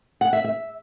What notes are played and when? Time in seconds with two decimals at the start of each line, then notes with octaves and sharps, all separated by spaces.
0.21 F#5
0.33 E5
0.44 E5